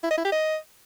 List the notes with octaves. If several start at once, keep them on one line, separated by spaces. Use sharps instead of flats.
E4
D#5
E4
G4
D#5